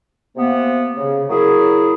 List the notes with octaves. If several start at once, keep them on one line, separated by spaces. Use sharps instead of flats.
C3 A#3 B3
C#3
F#3 A#3 E4 G#4